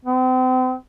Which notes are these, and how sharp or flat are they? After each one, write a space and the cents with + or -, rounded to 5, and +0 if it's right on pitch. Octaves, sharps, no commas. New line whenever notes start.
C4 -35